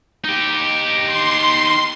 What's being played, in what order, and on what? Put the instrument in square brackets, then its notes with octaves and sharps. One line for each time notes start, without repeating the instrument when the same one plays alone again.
[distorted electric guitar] D#4 G4
[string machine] C6